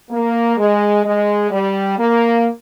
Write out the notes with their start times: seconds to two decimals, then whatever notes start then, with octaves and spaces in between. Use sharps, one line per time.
0.10 A#3
0.57 G#3
1.04 G#3
1.50 G3
1.97 A#3